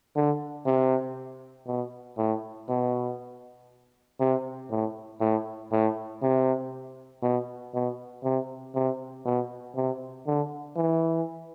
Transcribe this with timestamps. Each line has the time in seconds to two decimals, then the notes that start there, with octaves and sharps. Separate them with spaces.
0.16 D3
0.66 C3
1.67 B2
2.18 A2
2.68 B2
4.20 C3
4.70 A2
5.20 A2
5.72 A2
6.22 C3
7.22 B2
7.74 B2
8.24 C3
8.74 C3
9.25 B2
9.76 C3
10.27 D3
10.76 E3